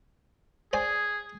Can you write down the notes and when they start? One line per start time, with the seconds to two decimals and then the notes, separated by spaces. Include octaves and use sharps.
0.73 G#4 C5 D5 G#5